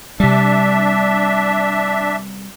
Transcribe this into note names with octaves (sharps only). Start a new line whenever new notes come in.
C3 G3 D4 E5